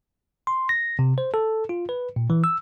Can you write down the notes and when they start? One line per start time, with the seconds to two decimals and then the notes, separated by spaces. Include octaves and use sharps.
0.47 C6
0.69 A#6
0.99 C3
1.18 C5
1.34 A4
1.69 F4
1.89 B4
2.16 A#2
2.30 E3
2.44 E6